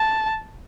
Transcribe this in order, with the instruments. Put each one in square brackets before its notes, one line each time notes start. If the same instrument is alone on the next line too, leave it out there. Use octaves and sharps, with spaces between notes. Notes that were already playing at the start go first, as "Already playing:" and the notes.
Already playing: [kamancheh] A5